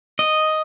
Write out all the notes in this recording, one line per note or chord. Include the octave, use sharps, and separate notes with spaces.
D#5